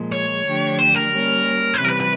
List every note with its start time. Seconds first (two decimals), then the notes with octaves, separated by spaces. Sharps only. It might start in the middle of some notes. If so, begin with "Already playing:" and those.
Already playing: A#2 F3 G#3
0.12 C#5
0.46 D3 F3 A3 D4 G4
0.79 C5
0.96 A#4
1.12 G3 A#3 C#4
1.74 C5
1.78 C3 B4
1.81 E3 G3 A#4
1.90 B4
2.00 B4